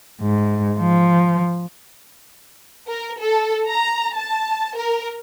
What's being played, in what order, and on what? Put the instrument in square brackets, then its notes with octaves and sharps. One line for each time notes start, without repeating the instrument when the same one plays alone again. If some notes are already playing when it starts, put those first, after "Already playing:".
[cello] G#2
F3
[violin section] A#4
A4
A#5
A5
A#4